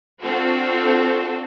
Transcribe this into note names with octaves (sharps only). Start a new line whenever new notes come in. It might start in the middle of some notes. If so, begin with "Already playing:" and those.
C4 D4 F4 F#4 A4